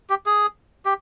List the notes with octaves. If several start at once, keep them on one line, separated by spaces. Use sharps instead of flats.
G4
G#4
G4